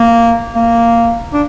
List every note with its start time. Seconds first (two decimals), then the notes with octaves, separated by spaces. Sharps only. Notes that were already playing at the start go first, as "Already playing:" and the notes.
Already playing: A#3
0.54 A#3
1.33 D4